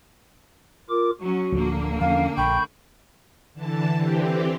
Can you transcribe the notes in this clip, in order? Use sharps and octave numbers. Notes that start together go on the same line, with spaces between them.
F4 A#4 D6
F#3 C#4 F#4
D1 D2 D3 F3 A#3
E2 F3 C#4 F5
A#1 G5 B5 C#6 G6
D3 E3 A5
D3 E3 C4 G4